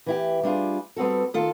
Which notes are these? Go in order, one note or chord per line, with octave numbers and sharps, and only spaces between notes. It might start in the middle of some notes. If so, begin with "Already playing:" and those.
E3 E4 G4
G3 D4 F4 G#4
G3 B3 C4 F#4 A4
D#3 F4 A4